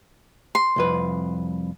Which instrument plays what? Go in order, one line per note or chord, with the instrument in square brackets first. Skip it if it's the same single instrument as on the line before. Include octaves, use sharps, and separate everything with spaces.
[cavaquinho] C6
[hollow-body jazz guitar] C2 F2 B4